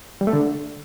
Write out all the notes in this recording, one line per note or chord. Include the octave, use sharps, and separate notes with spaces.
G3
A3
D3